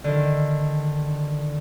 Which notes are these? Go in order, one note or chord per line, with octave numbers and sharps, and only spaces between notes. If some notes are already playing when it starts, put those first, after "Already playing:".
D3 D#3